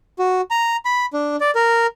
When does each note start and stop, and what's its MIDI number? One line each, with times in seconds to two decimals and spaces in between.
0.19 0.41 66
0.51 0.77 82
0.85 1.06 83
1.13 1.36 62
1.41 1.51 74
1.55 1.87 70